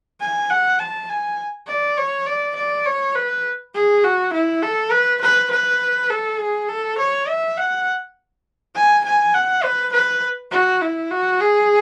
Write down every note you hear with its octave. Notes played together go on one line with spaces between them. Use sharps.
G#5
F#5
A5
G#5
D5
C#5
D5
D5
C#5
B4
G#4
F#4
E4
A4
B4
B4
B4
A4
G#4
A4
C#5
E5
F#5
G#5
G#5
F#5
B4
B4
F#4
E4
F#4
G#4